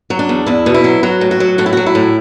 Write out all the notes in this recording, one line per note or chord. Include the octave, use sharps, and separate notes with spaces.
F#3
D4
E2
E2 E4
B2
E4
F#3
F#3 F#4
A2
F#4
F#3
A2 F#4
E4
F#3 F#4
E4
A2